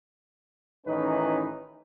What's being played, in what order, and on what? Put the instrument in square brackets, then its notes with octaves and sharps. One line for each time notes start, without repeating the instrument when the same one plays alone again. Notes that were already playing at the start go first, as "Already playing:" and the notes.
[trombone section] A1 D#3 E3 C#4 D#4 B4